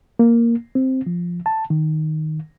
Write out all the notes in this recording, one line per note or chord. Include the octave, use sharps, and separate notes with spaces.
A#3
C4
F3
A5
D#3